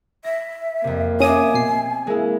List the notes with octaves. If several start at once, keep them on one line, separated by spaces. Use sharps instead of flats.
E5 A#6
F2 C3 A#3
C#4 D#5 E5 G#5 D6 D#6
B2 C7
G#3 A#3 E4